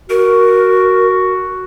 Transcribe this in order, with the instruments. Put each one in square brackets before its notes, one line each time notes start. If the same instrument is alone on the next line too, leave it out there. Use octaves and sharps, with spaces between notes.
[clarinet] F#4 [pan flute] A#4